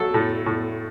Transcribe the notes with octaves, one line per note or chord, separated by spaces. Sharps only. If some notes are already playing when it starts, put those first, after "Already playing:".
Already playing: F#3 A4
A2
A2